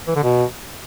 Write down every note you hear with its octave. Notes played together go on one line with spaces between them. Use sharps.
E3
D3
B2